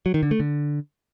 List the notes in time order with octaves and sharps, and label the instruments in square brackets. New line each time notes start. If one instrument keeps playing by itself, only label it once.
[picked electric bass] F#3
D#3
D3
A3
D3